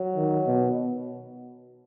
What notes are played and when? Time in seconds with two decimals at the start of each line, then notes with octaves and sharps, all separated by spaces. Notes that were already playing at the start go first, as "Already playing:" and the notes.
Already playing: F#3
0.16 D#3
0.47 B2